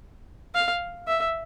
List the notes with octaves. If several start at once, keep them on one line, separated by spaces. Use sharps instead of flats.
F5
E5